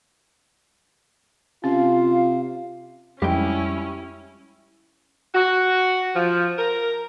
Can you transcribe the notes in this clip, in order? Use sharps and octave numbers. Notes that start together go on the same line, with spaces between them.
C3 C#4 F4 F5
F2 G3 G#3 C#4 E4 G4 G5
F#4
F3
A#4